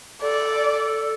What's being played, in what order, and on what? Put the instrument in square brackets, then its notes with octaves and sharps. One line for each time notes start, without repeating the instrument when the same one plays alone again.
[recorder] A4 [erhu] D5